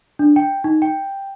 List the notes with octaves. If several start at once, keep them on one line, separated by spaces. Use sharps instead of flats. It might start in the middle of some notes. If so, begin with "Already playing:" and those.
D4
G5
D#4
G5